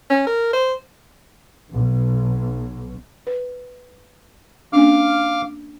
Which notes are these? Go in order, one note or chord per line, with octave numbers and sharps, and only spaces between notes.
C#4
A#4
C5
B1
B4
A#3 C#4 D4 F5 D6 F6